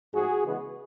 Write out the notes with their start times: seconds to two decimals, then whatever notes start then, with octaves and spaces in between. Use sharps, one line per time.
0.13 G#2 F3 A3 F#4 G#4
0.44 C#3 E3 G#3 B3